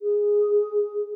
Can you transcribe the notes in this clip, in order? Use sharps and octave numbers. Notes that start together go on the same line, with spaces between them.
G#4